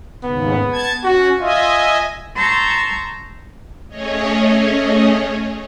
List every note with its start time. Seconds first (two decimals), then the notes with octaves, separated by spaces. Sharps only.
0.24 D#2 G#2 C#3 B3
0.72 A5 G#6
1.04 C#4 F#4
1.40 F4 D#5 E5 G#5
2.36 A5 A#5 C6 C#6 E6 G6
3.88 A3 C#4 G#4 C#5 D#5